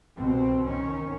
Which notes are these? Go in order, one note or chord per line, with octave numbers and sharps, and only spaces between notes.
C2 B2 C4
D#3 C#4